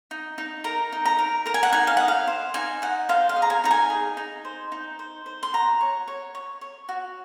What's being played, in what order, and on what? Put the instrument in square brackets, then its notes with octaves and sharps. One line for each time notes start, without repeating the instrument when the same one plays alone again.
[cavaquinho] D#4
D#4
A#4 A#5
D#4
A#5
A#4
A#4 A#5
G#5
F#5
D#4 G#5
F5
D#5 F#5
F5
C5
D#4 G#5
D#4 F#5
C5 F5
F5
G#4
A#5
G#5
D#4 A#5
G#5
G#4
D#4
C5
D#4
C5
C5
C6
F#4 A#5
C#5
C#5
C#5
C#5
F#4